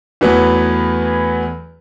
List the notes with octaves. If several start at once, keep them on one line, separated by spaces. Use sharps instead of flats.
E2 E3 F#3 A3 B3